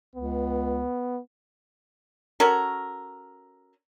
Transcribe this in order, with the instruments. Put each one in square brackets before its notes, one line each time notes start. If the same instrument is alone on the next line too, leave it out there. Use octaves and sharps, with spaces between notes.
[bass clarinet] C#2 [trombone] B3
[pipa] C#4 F#4 A4 A#4